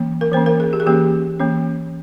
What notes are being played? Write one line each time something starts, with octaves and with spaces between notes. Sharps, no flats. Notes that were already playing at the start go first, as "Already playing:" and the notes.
Already playing: E3 A#3 C#4
A#4
E3 A#3 C#4 C5
A#4
G#4
G4
G#4
E3 A#3 C#4 G4
E3 A#3 C#4